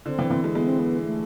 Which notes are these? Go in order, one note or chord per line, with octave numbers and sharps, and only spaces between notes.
D3 C4
E3
E3
G#3
G#3 B3
C4
B3
A3